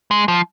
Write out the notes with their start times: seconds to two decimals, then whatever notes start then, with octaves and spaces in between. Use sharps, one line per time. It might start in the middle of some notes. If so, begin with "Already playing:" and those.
0.11 G#3
0.28 F3